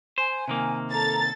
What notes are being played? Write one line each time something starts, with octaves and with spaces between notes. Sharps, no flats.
C5 G#5
C3 D#3 A#3
A4 A#5 A6